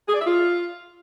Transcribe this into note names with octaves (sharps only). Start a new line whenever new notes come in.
G#4
D5
E5
F4